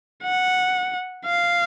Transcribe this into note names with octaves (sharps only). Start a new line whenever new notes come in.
F#5
F5